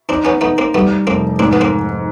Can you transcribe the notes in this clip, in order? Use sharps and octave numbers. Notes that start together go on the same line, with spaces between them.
C4 D4 D#4
B3 C#4
A3 B3 D#4
A#3 C4
G3 A3 B3
F1 A#3 C4
G#2 C4 D4
B3
A#3 C4